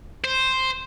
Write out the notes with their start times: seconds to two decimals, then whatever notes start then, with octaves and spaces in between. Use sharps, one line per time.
0.24 C5